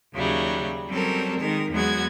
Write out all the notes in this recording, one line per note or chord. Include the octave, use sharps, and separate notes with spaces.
D#2 C#3 F#3 G3 E5
F#3 G3 C4 C#4 A4 A#4
D#3 G#3 A#4
E2 F#3 G#3 B3 F#4 G#6